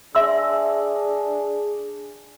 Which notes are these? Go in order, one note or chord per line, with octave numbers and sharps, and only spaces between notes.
D4 G#4 E5 C6 E6